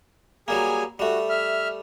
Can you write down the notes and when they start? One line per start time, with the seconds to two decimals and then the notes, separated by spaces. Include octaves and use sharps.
0.48 F#3 G3 A#3 G#4 G#5
0.99 G3 A3 F#4
1.29 E5 F6